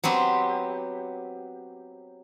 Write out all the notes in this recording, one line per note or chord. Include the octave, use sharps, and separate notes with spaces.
F#3 B3 C4 G4